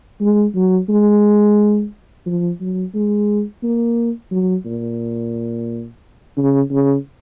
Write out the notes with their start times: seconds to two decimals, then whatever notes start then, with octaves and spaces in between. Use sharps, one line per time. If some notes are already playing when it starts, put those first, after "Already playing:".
0.21 G#3
0.55 F#3
0.89 G#3
2.26 F3
2.60 F#3
2.95 G#3
3.63 A#3
4.31 F#3
4.66 A#2
6.38 C#3
6.71 C#3